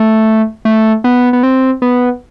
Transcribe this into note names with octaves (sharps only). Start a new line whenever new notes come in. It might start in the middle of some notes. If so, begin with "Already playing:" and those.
Already playing: A3
A3
B3
B3
C4
B3